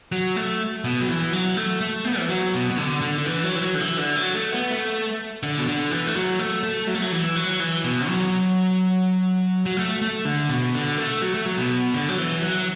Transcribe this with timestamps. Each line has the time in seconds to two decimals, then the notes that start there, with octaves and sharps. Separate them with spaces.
0.12 F#3
0.36 A3
0.84 B2
1.01 F#3
1.08 E3
1.33 F#3
1.57 A3
1.81 A3
2.05 B3
2.19 E3
2.29 F#3
2.54 B2
2.71 B2
2.78 D3
3.01 D3
3.18 D3
3.26 E3
3.44 F#3
3.55 E3
3.62 F#3
3.75 D3
3.80 E3
3.98 D3
4.16 F#3
4.34 A3
4.52 B3
4.70 A3
5.43 D3
5.58 B2
5.67 D3
5.91 E3
6.07 A3
6.15 F#3
6.39 A3
6.63 A3
6.87 F#3
6.95 A3
7.02 F#3
7.12 E3
7.36 F#3
7.60 E3
7.84 B2
8.08 F#3
9.66 F#3
9.77 A3
10.02 A3
10.25 D3
10.49 B2
10.74 D3
10.97 A3
11.22 F#3
11.34 A3
11.45 F#3
11.58 B2
11.94 D3
12.09 F#3
12.18 E3
12.42 F#3